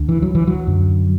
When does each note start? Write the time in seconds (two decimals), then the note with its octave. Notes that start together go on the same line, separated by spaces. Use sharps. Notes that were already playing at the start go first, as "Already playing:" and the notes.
Already playing: D2 D3
0.09 E3
0.22 F#3
0.35 E3
0.47 F#3
0.67 F#2 D3